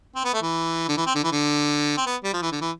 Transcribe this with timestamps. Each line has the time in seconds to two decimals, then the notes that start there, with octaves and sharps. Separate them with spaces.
0.15 C4
0.24 B3
0.34 A3
0.42 E3
0.88 D3
0.97 E3
1.06 C4
1.15 D3
1.24 E3
1.32 D3
1.97 C4
2.06 B3
2.24 G3
2.33 F3
2.42 E3
2.52 D3
2.61 E3